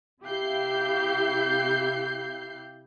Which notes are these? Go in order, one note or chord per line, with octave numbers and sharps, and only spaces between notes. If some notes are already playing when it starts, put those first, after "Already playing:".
C3 E4 G4 F5 G6 C7